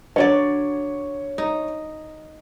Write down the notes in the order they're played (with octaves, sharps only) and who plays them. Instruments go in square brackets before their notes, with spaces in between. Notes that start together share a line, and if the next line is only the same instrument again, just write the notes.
[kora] D3 F#3 D5 [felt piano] C#5
[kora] D#4